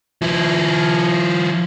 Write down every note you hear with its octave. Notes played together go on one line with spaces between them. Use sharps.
F3 E4